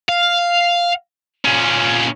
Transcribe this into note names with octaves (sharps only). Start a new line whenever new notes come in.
F5
A#2 C#4